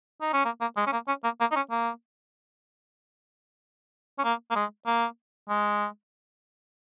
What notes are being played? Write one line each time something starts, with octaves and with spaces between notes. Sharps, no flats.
D#4
C#4
A#3
A#3
G#3
C#4
A#3
C#4
A#3
A#3
D#4
C#4
A#3
C#4
A#3
A#3
G#3
A#3
G#3